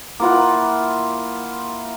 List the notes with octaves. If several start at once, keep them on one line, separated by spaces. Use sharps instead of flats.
A#3 E4 F4 F#5